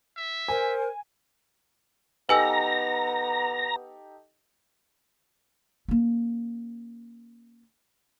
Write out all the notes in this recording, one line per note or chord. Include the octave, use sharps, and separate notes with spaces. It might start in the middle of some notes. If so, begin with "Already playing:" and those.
E5
A#4 C5 G#5
B3 D#4 G4 A4 B4 G#5 A#5 E6
A#3 C#4